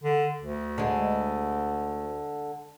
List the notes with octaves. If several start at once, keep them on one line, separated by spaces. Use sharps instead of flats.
D3
D2
D3 G#3